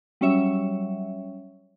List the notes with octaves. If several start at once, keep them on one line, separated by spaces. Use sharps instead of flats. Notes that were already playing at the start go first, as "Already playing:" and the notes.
F#3 G3 C#4 C#5 E5